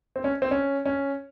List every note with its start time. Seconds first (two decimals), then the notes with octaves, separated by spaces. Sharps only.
0.16 C4
0.24 C#4
0.42 C4
0.51 C#4
0.85 C#4